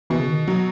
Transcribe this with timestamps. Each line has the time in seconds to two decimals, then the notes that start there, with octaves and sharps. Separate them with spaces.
0.10 B2 E3
0.20 C#3
0.29 D#3
0.48 F#3